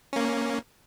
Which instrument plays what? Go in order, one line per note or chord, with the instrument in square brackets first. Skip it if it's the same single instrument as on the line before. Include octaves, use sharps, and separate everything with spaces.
[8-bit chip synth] A#3 C#4